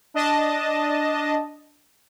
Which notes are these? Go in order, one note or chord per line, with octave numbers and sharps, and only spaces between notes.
D4 D#5 A5